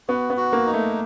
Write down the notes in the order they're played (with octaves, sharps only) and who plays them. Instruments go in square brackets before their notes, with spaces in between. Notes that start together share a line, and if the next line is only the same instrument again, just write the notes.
[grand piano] B3 [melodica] F#4
[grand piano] B3
[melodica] F#4
[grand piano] A#3
[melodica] D#4
[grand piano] A3